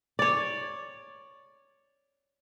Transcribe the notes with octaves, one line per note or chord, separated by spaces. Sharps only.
C#5 D5